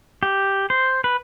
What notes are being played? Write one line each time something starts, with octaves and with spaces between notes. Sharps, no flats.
G4
C5
B4